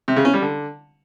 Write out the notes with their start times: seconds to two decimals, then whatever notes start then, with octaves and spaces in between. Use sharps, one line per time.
0.08 C3
0.16 C#3
0.25 C#4
0.33 G3
0.42 D3